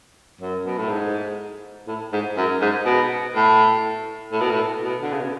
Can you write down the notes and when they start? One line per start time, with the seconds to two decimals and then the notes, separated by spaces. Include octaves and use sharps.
0.41 F#2
0.65 B2
0.78 A2
0.89 G#2
1.87 A2
2.13 G#2
2.37 F#2
2.61 G#2
2.85 B2
3.35 A2
4.32 A2
4.41 B2
4.51 A2
4.82 B2
5.02 D3
5.12 C#3
5.20 B2